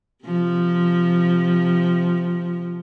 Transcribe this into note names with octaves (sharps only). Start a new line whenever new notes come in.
C3 F3